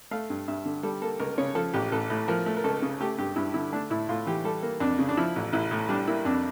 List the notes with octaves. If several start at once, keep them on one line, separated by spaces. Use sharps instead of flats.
A3 F5
G2
G2 E5
D3
G3 A4
A#3 A4
C#2 A#4
C#3 C#5
F3 A4
A1 G4
A1 A4
A2
F3 A#4
A3
A#4
C#2 A4
C#3
A3 G4
G2 G4
G2 E4
D3 E4
A3 D4
A2 E4
A2 F4
E3 G4
G3 A4
A#3
F2 D4
C#3
D4
F3 E4
A1
A1 E4
A2
G3 D4
A#3 E4
F2 D4